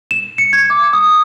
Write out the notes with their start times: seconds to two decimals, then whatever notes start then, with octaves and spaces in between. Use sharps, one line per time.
0.11 E7
0.38 C#7
0.53 G#6
0.70 D6
0.93 D#6